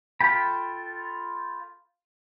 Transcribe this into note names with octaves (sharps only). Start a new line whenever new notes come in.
F4 A4 G5 B5